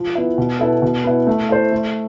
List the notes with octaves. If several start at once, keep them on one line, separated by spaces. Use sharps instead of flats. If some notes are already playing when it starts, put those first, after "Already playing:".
Already playing: F3
B3 E4
B2
B3 E4 A4
B2
B3 E4
A3
E4 A4 C5
A3